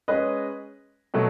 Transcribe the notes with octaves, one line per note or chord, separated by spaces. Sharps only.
G#3 C#4 G#4 B4 D#5
B2 F#3 A3